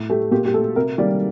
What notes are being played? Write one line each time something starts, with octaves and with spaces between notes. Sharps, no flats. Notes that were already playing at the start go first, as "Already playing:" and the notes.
Already playing: A2
A3 G4
A#2 G4
G4
A3 A4
C3 A#4
D#3 G3 A#3 D5